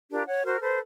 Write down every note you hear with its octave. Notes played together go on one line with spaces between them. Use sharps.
D4 F4 G4 A#4
C#5 F#5
F#4 A#4 C5 F6
A4 B4 C5